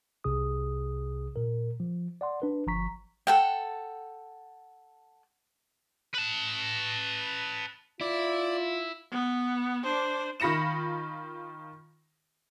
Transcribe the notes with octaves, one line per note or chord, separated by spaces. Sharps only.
C2 C3 G#4 D#6
A#2 A#4
F3
D5 F#5 C6
D4 B4
G1 F3 A#5 C#6 B6
A4 F#5 G5
B4 A5
E4 F4 D5
B3
D4 C5
D#3 F4 B5 A#6 C#7 E7